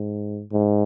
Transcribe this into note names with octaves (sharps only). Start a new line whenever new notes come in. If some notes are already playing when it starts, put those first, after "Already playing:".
Already playing: G#2
G#2